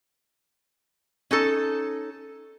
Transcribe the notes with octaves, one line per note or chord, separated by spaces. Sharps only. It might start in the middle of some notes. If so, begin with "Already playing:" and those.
C#4 D#4 A4